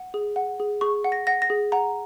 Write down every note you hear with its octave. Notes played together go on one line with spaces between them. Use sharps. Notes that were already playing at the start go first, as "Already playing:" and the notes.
Already playing: F#5
G#4
F#5
G#4
G#4 C#6
F#5
A#6
F#5 A#6
A#6
G#4
F#5 A#5